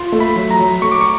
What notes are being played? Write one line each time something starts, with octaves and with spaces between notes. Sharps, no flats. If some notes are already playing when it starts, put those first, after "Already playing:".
Already playing: F4 C6
A3
B5
F#3
A#5
F#3
A3 C#6
D6
C#6